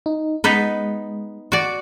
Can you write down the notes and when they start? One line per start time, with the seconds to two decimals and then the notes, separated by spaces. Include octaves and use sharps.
0.06 D#4
0.44 G#3 B3 D#4 B4
1.52 F#4 D5